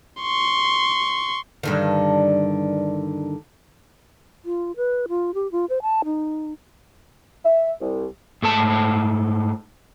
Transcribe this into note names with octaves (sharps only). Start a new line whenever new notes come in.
C6 C#6
G2 D3 D#3
F4
B4
F4
G4
F4
C5
A5
D#4
E5
C2
G#2 A3 A4 A5